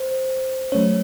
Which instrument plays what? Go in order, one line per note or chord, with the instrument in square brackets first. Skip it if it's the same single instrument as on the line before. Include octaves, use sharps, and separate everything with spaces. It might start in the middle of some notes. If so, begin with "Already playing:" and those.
Already playing: [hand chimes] C5
[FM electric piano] F#3 A3 C#4 [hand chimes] C#5